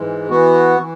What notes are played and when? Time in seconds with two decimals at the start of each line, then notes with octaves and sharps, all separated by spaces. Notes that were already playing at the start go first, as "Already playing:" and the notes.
Already playing: G#2 E3 G#3
0.30 E3 B3 F#4
0.80 E3